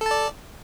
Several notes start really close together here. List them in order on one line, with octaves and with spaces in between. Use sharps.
A4 A5 D5